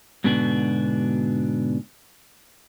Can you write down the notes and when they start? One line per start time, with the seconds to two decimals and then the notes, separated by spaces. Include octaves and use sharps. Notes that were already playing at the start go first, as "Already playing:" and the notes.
0.24 G#2 B2 D3 B3 D4 F#4